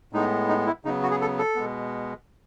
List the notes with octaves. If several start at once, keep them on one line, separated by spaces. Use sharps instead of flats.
A2 G#3 B3 D#4
D#4
E4
C#3 F#3 B3 D#4
F#4
G#4
A4
A4
B2 G#3 B3